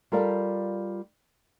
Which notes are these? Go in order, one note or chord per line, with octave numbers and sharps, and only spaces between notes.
G3 F4 A4 A#4 D5 F5